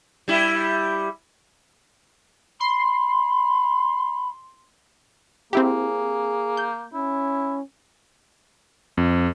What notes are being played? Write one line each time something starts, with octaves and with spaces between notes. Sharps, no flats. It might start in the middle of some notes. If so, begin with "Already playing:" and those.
G3 E4
B5 C6
A#3 C4 E4 G4 G#4
G6
C#4 E4
F2